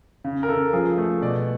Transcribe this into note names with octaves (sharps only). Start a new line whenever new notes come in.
C#3
A#4
C#3 A4
F3 G#4
A3
B2 D5